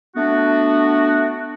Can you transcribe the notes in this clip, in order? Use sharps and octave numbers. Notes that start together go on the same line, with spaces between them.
A3 B3 D4 F#4